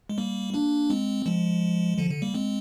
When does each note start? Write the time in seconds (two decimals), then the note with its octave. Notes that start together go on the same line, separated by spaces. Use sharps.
0.09 G#3
0.18 G3 A#3
0.54 A#3 D4
0.90 G#3 C4
1.26 F3 G#3
1.98 D3 F3
2.10 D3
2.22 G3 A#3
2.34 G#3 C4